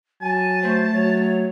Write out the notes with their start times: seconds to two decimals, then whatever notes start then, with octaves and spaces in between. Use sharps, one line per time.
0.22 F#3 G#5 A5
0.63 A3 C5
0.93 F#3 C#5